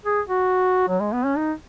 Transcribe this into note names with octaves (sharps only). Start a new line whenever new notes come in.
G#4
F#4
F#3
G#3
B3
C#4
D#4